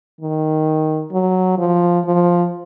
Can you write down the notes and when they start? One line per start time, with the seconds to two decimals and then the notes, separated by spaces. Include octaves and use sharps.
0.21 D#3
1.12 F#3
1.58 F3
2.05 F3